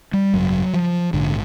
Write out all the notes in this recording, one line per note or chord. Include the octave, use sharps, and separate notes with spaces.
G3
G#1 F#2 C#3 F#3
F3
A#1 G#2 D3